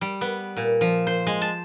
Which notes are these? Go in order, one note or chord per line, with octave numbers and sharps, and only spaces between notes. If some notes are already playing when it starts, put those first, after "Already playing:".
G3
B3
A#2
F3
C5
G#3
A5